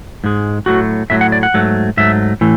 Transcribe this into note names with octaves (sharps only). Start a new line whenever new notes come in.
G#2 G#3
A2 F#3 A3 F#4
A2 F#3 A3 E5
F#5
D5
F#5
G#2 F#3 A3
G#2 F#3 A3 E5
A2 E3 A3